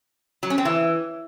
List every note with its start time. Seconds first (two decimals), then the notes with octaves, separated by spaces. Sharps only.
0.43 F#3
0.50 C#4
0.58 C4
0.65 E3